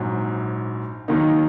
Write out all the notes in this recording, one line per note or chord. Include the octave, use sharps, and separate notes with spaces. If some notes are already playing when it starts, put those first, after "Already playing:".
Already playing: A#1 G#2 F#3
D#2 D#3 F#3 A#3 D#4